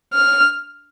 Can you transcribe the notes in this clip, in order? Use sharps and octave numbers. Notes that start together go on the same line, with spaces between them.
F6